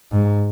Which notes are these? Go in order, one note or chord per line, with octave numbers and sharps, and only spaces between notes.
G#2